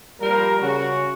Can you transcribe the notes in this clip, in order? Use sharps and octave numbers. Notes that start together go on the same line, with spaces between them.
F3 G3 A#3 A#4
C#3 F#4